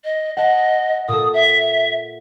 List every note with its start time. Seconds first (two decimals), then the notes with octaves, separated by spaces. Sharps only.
0.04 D#5
0.37 D#5 F#5 A5
1.08 A#2 A4 D#6
1.33 E5